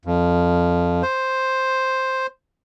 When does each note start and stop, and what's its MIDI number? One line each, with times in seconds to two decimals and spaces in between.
0.05 1.03 41
1.03 2.27 72